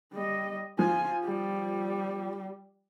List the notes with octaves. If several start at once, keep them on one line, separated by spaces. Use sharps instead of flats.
G3 D#5
F3 F4 G#5
G3